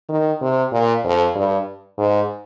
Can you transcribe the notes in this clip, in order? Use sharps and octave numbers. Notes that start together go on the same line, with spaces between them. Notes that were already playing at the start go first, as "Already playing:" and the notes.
D#3
C3
A#2
F2
G2
G#2